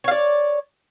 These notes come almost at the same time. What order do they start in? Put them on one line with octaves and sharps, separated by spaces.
C#5 F5 D5